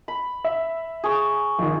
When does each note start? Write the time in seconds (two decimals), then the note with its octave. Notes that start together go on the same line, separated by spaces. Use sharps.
0.08 B5
0.44 E5
1.04 G#4 C#5
1.59 A#1 D#3